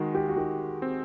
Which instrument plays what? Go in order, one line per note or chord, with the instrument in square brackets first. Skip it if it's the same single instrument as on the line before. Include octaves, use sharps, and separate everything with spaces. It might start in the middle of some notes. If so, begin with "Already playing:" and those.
Already playing: [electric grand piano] D#3 G#3 [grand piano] F#4
[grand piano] G4
F#4
[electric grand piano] D#3 [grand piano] G4
[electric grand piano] C4